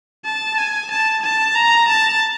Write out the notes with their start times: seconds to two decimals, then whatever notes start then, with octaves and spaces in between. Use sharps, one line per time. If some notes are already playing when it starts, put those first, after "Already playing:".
0.25 A5
0.57 G#5
0.91 A5
1.23 A5
1.55 A#5
1.88 A5